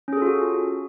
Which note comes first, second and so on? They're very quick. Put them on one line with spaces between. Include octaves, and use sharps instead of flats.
C#4 G#4 A4 F4 F#4